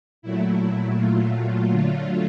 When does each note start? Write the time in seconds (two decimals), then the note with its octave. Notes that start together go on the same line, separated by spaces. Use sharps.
0.22 A#2 F#3 A3 E4
0.60 E4
0.96 A#2 F#3 A3 F4
1.70 D3 F#3 A3 F4